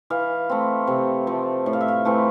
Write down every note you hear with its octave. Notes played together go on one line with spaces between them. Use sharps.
E3 F5
A3 C4
C3
F3 A3
A2
F5
E5
F5
E3 A3 C4